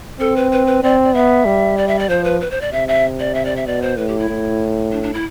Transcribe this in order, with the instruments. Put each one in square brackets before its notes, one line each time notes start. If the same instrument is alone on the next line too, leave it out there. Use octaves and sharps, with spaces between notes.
[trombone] C4 [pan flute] A4
[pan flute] B4
B4
B4
[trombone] C4 [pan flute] D5
[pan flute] D5
[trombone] B3 [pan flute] E5
[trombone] G3
[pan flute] D5
E5
D5
[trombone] F3 [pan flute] C5
[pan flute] B4
B4
C5
D5
[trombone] C3 [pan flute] E5
[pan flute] E5
D5
E5
D5
E5
[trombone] B2 [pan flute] D5
[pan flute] C5
[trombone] A2 [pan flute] B4
[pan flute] G4
E4
[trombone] A2
[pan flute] D4
D4
E4